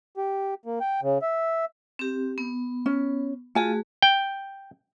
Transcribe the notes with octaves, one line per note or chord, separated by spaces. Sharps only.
G4
A#3
G5
C#3
E5
C4 G4
B3
C#4
A3 F4 F#4 G#4 G#5
G5